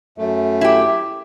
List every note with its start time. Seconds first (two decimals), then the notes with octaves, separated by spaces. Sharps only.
0.18 F#2 A3
0.61 E4 G4